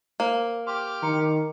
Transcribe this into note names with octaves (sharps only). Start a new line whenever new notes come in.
A#3 C5
G4 C6 D6 F6
D#3 A#5 C6 C#7